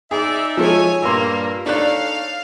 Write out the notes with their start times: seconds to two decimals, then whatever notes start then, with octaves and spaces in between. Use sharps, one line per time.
0.11 D#4 G#4 D5 E5
0.57 F3 G#3 A4 C#5 G#5
1.02 G2 A#2 A#3 C6 E6
1.66 D4 D#4 A4 C#5 D5 F5 F#6